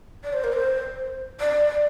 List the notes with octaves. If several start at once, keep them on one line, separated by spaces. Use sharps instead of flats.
D5
C5
A#4
C5
D5